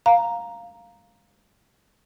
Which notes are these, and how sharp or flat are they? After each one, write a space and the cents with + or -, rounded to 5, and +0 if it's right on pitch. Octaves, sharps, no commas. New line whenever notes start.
F5 +0 A#5 +0